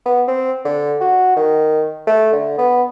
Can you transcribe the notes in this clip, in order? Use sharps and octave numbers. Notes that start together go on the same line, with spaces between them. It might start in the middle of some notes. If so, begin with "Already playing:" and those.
B3
C4
D3
F#4
D#3
A3
D3
B3